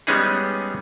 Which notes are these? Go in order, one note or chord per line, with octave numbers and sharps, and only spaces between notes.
G3 G#3 B3 C#4 D#4 G#4